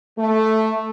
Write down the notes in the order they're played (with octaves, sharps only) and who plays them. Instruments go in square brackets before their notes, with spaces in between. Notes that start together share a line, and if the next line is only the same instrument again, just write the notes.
[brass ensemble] A3